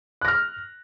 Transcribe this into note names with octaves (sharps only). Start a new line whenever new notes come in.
F6 F#6 A#6